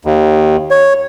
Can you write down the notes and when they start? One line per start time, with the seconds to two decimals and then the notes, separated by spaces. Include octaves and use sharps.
0.05 D#2
0.71 C#5